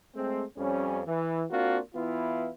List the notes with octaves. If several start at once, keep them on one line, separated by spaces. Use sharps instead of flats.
G#3 A3 C4
F2 G3 C#4
E3
A#3 C4 D4 F4 F#4
E3 B3 E4 F4